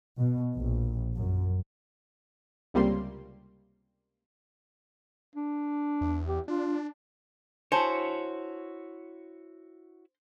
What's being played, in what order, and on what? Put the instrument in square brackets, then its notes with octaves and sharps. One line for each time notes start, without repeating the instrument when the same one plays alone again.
[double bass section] B2
A#1
F#2
[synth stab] C#2 C3 G3 A#3 C6
[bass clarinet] D4
[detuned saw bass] E2
[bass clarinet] G4
[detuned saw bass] D4 [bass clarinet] F4
[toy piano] D4 A5 [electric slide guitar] E4 F#4 C#5 [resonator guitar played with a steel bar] C5